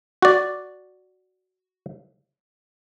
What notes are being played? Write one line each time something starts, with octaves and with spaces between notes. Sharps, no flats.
F#4 D5